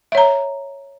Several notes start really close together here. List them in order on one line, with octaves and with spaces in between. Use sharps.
E5 C#5 A#5